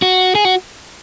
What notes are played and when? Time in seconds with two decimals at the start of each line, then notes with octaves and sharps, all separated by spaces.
0.02 F#4
0.35 G#4
0.45 F#4